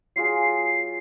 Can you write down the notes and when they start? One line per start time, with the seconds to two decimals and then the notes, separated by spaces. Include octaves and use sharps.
0.16 F#3 F4 G#4 C7